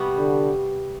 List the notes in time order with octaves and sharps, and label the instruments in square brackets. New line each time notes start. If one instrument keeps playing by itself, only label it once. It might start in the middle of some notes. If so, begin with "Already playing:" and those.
Already playing: [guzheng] C3 G3 B3 F#4
[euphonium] D3